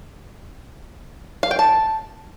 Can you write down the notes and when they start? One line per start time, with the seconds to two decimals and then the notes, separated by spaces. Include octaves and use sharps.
1.43 F5
1.51 G5
1.59 A5